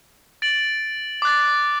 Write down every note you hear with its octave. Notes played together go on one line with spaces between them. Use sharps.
A6 D7 F#7
D6 F#6 A6